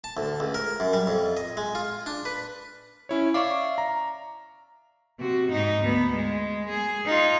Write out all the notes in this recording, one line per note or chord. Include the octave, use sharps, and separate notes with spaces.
A5
D2
C#2
A#4
F#2
G3
F2
D#5
G#3
F4
D4
B4
C#4 E4 C#5
D5 E5 F5 C#6 D6
A#5
C3 F#4
G#2 D#4
D2 B3
G#3
G#4
D#4 F4